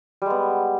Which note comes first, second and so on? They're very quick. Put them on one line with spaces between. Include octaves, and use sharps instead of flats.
G3 G#3 B3